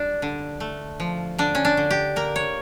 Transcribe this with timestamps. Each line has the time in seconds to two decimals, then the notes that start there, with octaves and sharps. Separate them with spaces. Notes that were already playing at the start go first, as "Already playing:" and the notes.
Already playing: G3 D4
0.22 D3
0.60 A3
1.00 F3
1.38 D3 D4
1.55 C#4
1.65 D4
1.77 D3
1.91 G4
2.16 A#3 A#4
2.36 C#5